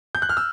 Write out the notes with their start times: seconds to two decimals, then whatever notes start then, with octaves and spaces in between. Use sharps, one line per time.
0.15 G6
0.22 F#6
0.29 F6
0.37 E6